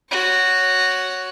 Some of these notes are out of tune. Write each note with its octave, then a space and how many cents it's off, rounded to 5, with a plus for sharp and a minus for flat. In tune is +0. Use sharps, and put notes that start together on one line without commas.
F#4 +0 C#5 +0